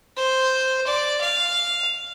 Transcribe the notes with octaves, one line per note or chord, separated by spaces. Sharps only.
C5
D5
F5